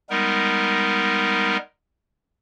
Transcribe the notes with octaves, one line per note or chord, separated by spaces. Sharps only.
G3 G#3 B3 D#4 A#4